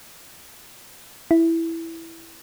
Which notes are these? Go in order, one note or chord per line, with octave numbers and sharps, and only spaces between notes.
E4